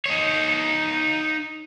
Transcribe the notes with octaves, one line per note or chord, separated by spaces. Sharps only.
D#4 C#5